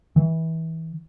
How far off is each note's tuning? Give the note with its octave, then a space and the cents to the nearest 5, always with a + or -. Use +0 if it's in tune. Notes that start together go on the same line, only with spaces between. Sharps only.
E3 -25